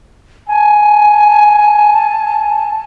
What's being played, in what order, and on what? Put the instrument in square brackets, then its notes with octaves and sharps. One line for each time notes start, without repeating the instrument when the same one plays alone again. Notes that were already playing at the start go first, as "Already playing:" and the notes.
[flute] G#5 [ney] A5